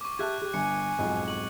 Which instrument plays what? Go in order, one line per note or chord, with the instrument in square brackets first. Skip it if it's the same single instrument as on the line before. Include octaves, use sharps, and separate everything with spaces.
[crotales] C#6 D6
[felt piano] G4 E5 A5 [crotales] F#6 G#6
[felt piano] G4
[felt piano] G1 [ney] G#5 [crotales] C#7
[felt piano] B1 F2 G#2
[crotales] C#6 F#7